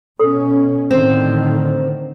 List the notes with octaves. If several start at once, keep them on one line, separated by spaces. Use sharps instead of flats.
B2 C#4 A4
A2 D3 D#3 C4 C5